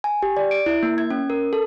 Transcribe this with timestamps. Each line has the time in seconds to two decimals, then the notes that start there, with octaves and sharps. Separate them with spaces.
0.04 G#5
0.23 G4
0.37 D5
0.51 D7
0.66 E4
0.83 A#3
0.98 G#6
1.10 C#4
1.30 A#4
1.53 A4